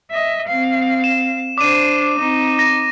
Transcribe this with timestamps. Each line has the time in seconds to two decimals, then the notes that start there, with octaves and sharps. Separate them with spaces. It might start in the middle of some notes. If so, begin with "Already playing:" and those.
0.10 D#5 E5
0.47 C4 F5
1.04 E7
1.58 D4 C5 D6 D#7
2.17 C4 D#4
2.59 A#6